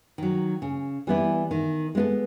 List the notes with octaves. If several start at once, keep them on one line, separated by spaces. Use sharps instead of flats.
D#3 F#3
C#3
E3 G3 B3 E4
D#3
G#3 B3 E4 A4